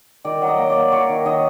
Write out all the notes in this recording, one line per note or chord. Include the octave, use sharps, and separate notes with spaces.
D#3 D5
F#3
D#5
A#3
D5
A#3
F#3 C#5
D#3
D#3 D#5